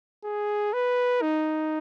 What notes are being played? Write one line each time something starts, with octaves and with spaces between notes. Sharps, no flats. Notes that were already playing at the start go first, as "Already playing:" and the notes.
G#4
B4
D#4